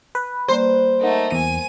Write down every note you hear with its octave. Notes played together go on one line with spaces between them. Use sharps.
B4
G3 A#3 C5 D5
A3 D#4 A#4 F#5
E2 G#5 D#7